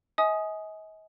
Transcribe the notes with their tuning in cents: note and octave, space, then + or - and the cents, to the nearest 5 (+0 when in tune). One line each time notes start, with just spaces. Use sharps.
D#5 +40 G#5 +15 D#6 +0